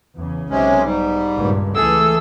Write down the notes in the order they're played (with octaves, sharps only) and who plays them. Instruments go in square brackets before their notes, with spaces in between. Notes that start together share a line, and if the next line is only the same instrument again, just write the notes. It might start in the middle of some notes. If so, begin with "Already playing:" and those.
[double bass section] E2 C#3
[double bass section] B1 [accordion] C3 G#3 C#4
[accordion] G#2 G3
[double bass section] C#2 G2 A#2
[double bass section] C#2 E3 A3 [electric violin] G#4 E6 [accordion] A4